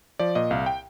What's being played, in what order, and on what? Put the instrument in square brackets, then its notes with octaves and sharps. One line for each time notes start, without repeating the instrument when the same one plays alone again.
[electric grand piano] F3 D5
A#2 D#5
C2 F5
G5